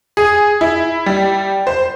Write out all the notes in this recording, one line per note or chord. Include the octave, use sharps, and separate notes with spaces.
G#4
E4
G3
C5